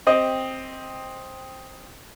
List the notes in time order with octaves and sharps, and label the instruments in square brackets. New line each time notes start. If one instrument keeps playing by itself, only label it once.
[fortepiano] C4 G4 D#5